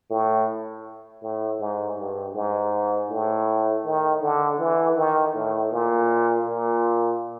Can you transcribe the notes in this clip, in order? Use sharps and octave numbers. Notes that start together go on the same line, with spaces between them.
A2
A2
G#2
G2
G#2
A2
D#3
D3
E3
D#3
A2
A#2
A#2